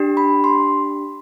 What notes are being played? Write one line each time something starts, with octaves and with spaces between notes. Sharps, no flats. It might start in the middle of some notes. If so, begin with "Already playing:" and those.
Already playing: D4 G4
B5
C6